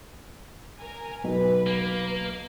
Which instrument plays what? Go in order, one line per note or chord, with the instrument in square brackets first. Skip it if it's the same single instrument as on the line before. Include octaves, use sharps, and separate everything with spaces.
[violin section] A#4 G#5
[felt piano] B1 [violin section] B4
[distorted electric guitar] A#3